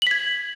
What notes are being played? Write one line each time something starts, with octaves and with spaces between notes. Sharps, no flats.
G#6 B6 F#7